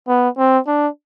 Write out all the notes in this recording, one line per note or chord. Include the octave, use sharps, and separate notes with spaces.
B3
C4
D4